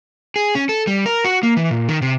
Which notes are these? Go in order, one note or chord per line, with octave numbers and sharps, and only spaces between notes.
G#4
C#4
A4
G3
A#4
F#4
A#3
E3
A#2
D#3
C3